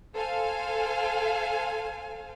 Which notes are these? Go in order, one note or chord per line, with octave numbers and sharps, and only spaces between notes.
A4 C5 F5 G#5